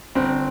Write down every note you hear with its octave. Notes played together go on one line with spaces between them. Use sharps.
G1 C4